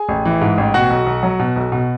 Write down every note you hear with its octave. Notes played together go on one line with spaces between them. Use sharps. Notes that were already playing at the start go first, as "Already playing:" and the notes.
Already playing: G#4 G#5
A1
E3
G#2
A1
B2 F#4 F#5
B1
B1
F#3
B2
B1
B2